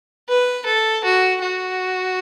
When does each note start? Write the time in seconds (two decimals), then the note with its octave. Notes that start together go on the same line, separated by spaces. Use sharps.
0.28 B4
0.66 A4
1.04 F#4
1.41 F#4